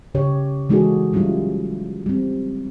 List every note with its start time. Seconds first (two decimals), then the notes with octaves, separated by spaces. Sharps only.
0.15 C#3 G4 C#5
0.69 E3 G#3 D#4 F#4 G#4 A4
1.13 F#3 G3 C#4 E4 F4
2.06 G3 C4